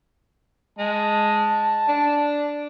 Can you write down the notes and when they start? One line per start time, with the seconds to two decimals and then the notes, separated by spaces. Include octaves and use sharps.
0.79 G#3 A5
1.88 D4